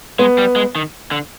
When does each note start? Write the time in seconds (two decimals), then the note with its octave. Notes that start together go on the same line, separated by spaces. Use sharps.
0.19 G#3 B3
0.38 G3
0.56 G#3
0.75 D#3
1.11 D3